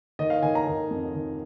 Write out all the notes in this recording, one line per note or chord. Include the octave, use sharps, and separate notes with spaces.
D#3 D#5
F5
D#3 G#5
A#5
D#3
F2
D#3